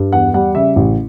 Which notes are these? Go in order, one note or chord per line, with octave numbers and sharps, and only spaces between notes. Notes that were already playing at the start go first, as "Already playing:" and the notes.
Already playing: G2
E2 F#5
G3 F#5
C#3 E5
A1